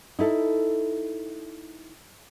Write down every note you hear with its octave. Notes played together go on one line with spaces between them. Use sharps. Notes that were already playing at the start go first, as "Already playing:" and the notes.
D#4 E4 A4